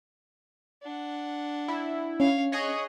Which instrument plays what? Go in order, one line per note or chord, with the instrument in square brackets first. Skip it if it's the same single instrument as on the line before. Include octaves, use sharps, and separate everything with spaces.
[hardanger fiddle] D4 F#5
[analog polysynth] E4
[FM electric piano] C#4 [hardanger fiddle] C#5 F5
[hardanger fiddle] G#4 [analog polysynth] C#5 D#5 F#6